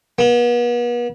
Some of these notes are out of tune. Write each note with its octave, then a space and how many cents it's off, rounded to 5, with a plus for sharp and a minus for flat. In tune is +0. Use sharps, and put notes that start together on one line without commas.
B3 -40